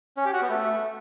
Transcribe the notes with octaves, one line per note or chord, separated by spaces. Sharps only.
C#4
G4
F#4
B3
A3